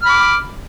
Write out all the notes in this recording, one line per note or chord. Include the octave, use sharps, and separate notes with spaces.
B5 D6 F6